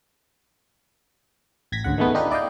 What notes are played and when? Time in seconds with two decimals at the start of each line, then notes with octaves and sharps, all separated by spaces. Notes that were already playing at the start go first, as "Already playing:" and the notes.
1.72 A1 G#6 A#6 B6
1.84 G#1 D2 C#3 F#5
1.98 D#3 G#3 A3 B3
2.14 D4 D#4 F4 G4 B4
2.30 E4 D5 D#5 F5 G5